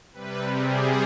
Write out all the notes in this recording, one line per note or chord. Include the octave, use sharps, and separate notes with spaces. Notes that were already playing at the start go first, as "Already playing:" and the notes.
C3 G3 B4
G#4